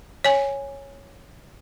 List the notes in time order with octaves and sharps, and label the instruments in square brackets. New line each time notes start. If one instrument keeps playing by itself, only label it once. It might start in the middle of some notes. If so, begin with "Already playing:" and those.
[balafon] C#5 G#5